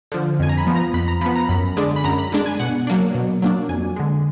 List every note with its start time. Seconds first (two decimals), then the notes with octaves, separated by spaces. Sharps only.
0.12 D3 F3
0.39 F2 G#5
0.49 A#5
0.57 B5
0.67 F3 B3
0.75 A#5
0.94 F2 B5
1.08 A#5
1.21 F3 B3 B5
1.36 A#5
1.49 F#2 B5
1.77 D3 G#3 D4
1.96 B5
2.04 F#2 A#5
2.19 B5
2.32 D3 G#3 D4
2.46 G#5
2.60 B2 F#5
2.87 F#3 A#3 D4
3.15 B2
3.42 F#3 A#3 D4
3.69 F2 G#5
3.96 D3 G#3